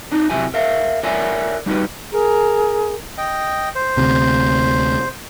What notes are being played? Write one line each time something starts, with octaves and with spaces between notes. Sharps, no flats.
D4 D#4
C3 F#3 E4 G4 G#5
A#4 E5 F5
A4 A#4 C#5 D5 E5 G#5
G3 D#4 F#4 G4 B4
G#4 A#4
D#5 G5
C5
D2 C3